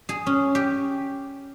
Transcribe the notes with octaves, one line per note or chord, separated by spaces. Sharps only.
G#4
C#4
G4